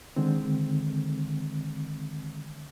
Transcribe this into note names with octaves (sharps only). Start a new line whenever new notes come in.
D3 D#3 G#3 C4